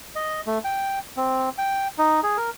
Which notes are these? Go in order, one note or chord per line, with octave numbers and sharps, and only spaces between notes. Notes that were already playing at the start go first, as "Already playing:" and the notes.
D#5
A3
G5
C4
G5
D#4
G#4
A#4